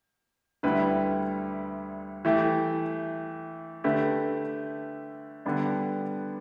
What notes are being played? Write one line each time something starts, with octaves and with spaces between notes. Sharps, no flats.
D2 D3 G3 E4 B4
E3 A3 G4
D3 A3 G4 B4
D3 G3 B3 D4